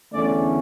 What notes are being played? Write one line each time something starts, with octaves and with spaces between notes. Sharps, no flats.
E2 D3 A3 C#4 D5